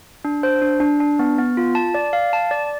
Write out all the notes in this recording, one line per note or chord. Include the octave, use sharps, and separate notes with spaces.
D4
C5
D4
D4
D4
B3
B3
F4
A5
D5
F5
A5
D5